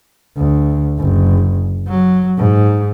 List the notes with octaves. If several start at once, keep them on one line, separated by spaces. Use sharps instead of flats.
D2
F#1
F#3
G#2